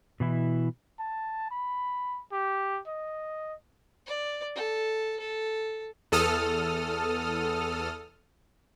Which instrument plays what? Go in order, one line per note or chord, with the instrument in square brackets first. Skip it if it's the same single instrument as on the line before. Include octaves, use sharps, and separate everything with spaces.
[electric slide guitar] B2 E3 E4
[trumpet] A5
B5
G4
D#5
[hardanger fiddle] D5
A4
A4
[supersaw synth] E2 A4 D#6 F6